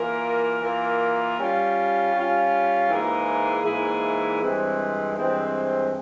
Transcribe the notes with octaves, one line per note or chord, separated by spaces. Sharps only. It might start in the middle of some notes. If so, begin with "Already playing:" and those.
Already playing: E3 A#3 F4 A#4
E3 A#3 F4 A#4
G3 C#4 F4
G3 C#4 F4
G#2 E3 A#3 E4 G#4
G#2 E3 A#3 E4 G#4
G2 E3 G#3 C4
G2 E3 G#3 C4